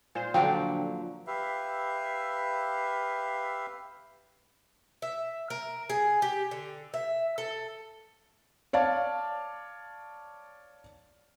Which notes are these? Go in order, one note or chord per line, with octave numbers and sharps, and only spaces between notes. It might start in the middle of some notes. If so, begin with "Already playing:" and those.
A#2 C5
D3 F3 F#3 D5 G5
G4 B4 E5 F5
E5
A#4
G#4
G4
D3
E5
A4
C#5 D5 F5 A5